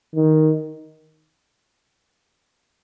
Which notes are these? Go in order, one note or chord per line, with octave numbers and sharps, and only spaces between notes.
D#3